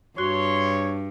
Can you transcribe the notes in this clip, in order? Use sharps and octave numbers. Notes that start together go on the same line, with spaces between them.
G2 F#4 C#5 C6